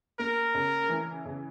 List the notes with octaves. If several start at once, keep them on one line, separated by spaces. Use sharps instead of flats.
A#3 A#4
C#3
E3
C#3